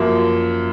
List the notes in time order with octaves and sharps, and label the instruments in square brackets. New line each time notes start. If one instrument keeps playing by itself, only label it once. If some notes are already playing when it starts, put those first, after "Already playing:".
Already playing: [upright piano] F#2 F3 A#3